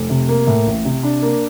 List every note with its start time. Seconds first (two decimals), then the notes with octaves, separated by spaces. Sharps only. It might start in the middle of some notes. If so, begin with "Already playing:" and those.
Already playing: F1
0.10 C3
0.29 A#3
0.47 A2
0.66 A1
0.85 C3
1.03 D4
1.22 A#3